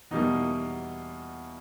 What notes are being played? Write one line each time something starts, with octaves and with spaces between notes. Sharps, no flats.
E2 B2 G3 A#3 D#4